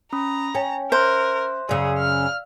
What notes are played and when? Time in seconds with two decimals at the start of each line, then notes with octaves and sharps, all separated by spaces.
0.13 C#4 A#5 B5 D#6
0.55 C#4 G5
0.92 A#4 C5 E5 F#6
1.69 F#2 C#3 G#4 D5 F5 E6
1.99 F6